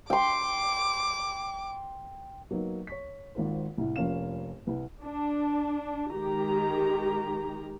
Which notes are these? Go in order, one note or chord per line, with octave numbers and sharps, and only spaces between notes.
G5 C6 D6
F#3 A#3 B3 D#4
C#5 C#6 B6
G#1 G#2 F4 A#4 C5
C2 A2
F1 A#3 C#4 F4 F5 E7
C2 B4
D4
D#3 G#3 G4 A#5